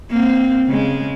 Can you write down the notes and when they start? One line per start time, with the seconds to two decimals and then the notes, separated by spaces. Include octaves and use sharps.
0.10 A#3 C4
0.66 C#3 G#3